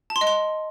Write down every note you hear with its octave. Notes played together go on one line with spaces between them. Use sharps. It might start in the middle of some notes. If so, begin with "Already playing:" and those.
A5
C6
D#5
C6